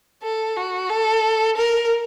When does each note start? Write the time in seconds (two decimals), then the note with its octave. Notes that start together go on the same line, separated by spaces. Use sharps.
0.23 A4
0.57 F#4
0.90 A4
1.57 A#4